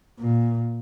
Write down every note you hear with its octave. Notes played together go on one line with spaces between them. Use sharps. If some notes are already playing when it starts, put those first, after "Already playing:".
A#2